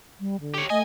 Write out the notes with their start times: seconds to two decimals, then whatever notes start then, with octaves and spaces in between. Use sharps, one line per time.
0.20 G3
0.41 D3
0.54 G4 C#5
0.70 A3 D#5 G#5